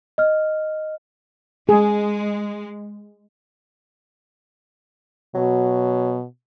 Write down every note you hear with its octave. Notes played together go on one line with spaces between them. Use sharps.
D#5 F6
G#3 G#4
B2 F#3